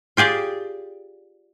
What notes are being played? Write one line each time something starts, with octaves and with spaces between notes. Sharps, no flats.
F4 G4 G#4 D5